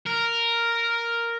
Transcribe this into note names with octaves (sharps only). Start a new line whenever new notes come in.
A#4